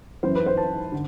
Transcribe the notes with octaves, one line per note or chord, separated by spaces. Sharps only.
F#1 F#2 E3 C5
B4
C5
A5
D3